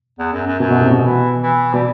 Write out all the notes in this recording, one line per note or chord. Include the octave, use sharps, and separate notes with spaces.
E2
F#2
F#2
F#2 B2
B2
A2 C3
B2
E3
E3
B2 G3